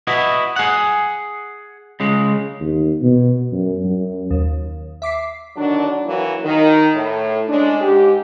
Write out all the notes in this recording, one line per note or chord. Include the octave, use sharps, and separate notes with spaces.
E4 F#4 B4 D#5
G#4 F#5
C#3 G#3
D#2
B2
F#2
F#2
D#2
E5 D6 B6 C7
D3 D#3 F#3 D4
E3 F#3 A#3 E4 F#4
D#3
A2
G#3 C#4 D4
G#2 G4